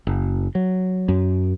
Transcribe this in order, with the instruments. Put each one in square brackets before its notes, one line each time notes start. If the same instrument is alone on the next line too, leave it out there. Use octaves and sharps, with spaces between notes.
[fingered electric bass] F#1
F#3
F#2